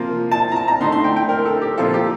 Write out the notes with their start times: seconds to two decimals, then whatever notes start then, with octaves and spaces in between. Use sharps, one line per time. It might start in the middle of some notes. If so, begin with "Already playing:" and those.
Already playing: C3 F3 A#3 F4
0.32 A5
0.52 A#5
0.56 A5
0.68 A#5
0.80 D3 A3 D#4 C6
0.92 C6
1.04 G5
1.16 G5
1.29 A#4
1.45 A4
1.62 G4
1.78 A#2 F3 C4 F4 A4
1.94 G4